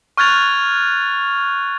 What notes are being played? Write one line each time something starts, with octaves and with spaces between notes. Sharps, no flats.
C#6 F6 F#6 G#6 A6 F7